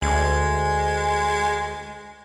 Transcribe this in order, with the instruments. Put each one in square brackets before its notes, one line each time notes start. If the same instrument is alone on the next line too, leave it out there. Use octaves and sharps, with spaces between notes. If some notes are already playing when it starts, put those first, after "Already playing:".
[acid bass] D2 [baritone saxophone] G#3